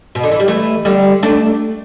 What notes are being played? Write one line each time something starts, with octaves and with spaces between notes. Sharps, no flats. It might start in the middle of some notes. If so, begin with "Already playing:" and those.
B2
D3
E3
G3
E3 A3
D3 G3
A3 D4